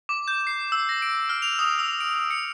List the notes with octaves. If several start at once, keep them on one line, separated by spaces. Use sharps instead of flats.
D6
G6
C7
E6
A#6
D7
F6
F7
D#6
E6
D7
C#7